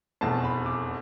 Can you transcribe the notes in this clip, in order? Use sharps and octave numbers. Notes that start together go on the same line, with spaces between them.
F1 E2 B2 A5
B5
D6